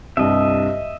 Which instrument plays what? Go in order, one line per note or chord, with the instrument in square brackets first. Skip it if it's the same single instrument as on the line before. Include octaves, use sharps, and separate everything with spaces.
[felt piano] C2 G2 [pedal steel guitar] D#5 E5